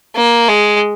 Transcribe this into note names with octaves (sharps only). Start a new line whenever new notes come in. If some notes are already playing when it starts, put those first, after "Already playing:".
A#3
G#3